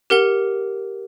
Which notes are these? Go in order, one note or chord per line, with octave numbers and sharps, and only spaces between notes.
G4 A#4 F#5 G7